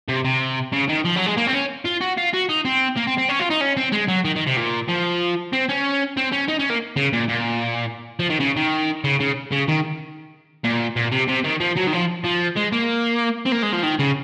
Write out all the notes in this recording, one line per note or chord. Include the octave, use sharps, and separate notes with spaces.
C3
C3
C#3
D#3
F3
F#3
G#3
A#3
C4
C#4
F4
F#4
F4
F#4
D#4
C4
A#3
C4
C4
C#4
F4
D#4
C#4
C4
G#3
F#3
D#3
D#3
C3
A#2
F3
C4
C#4
C4
C#4
D#4
C#4
A#3
C#3
A#2
A#2
F3
D#3
C#3
D#3
C#3
C#3
C#3
D#3
A#2
A#2
C3
C3
D#3
F3
F#3
D#3
F3
F3
G#3
A#3
C4
A#3
G#3
F3
D#3
C#3